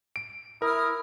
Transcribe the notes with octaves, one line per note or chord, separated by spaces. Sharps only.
D7
E4 A#4 D#6 F6